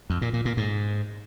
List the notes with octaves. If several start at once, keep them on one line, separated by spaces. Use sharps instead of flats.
F2
A#2
A#2
A#2
G#2